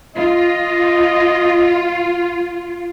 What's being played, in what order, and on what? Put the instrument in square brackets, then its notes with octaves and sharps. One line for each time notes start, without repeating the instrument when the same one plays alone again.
[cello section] F4 [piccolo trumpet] D#5